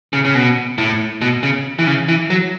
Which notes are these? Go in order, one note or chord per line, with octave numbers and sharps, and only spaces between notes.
C#3
C#3
B2
A2
B2
C#3
E3
C#3
E3
F#3